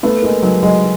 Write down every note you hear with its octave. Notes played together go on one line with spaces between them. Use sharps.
A3 B3
G#3 A#3
F#3 G#3
F#3 G#3